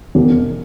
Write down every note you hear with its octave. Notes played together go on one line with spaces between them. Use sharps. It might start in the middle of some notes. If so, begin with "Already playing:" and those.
E1